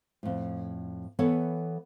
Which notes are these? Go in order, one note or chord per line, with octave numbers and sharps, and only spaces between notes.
F2 A2
E3 B3 A4 B4 C#5